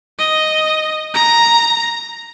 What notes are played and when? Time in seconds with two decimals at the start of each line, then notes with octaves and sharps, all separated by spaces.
0.19 D#5
1.14 A#5